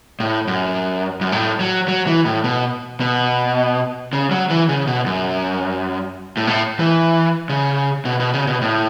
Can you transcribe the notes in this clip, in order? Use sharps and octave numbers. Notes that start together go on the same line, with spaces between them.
A2
F#2
F#2
A2
F#3
F#3
E3
A2
B2
B2
C#3
F#3
E3
C#3
B2
F#2
A2
B2
A2
E3
C#3
B2
B2
C#3
B2
A2